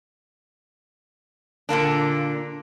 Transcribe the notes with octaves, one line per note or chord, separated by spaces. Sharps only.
A#2 D3 A#3 D4